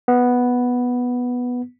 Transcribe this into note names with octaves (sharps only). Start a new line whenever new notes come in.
B3